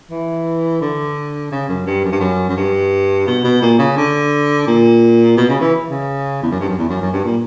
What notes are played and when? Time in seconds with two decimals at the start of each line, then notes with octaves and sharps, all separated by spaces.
0.11 E3
0.81 D3
1.52 C#3
1.69 F#2
1.86 G2
2.04 F#2
2.12 G2
2.20 F#2
2.49 F#2
2.57 G2
3.27 B2
3.44 B2
3.62 A#2
3.79 C#3
3.97 D3
4.67 A#2
5.37 B2
5.49 C#3
5.61 E3
5.90 C#3
6.42 E2
6.51 F#2
6.60 G2
6.69 F#2
6.78 E2
6.89 F#2
7.02 F#2
7.13 G2
7.24 A#2